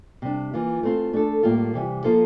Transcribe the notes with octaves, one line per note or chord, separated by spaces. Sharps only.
C3 G3 D4
E3 A#3 F4
A3 C4 F4
A3 D4 A4
A2 G3 A#3 F4
C3 E3 G3
F3 A#3 F4 A4 C5